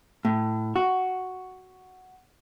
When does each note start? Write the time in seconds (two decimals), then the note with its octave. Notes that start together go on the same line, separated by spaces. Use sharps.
0.25 A2
0.76 F#4